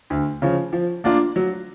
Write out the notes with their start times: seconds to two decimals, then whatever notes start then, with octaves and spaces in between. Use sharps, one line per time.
0.10 D2
0.42 C#3 F3
0.73 F3
1.04 A#3 D4 F4
1.36 F#3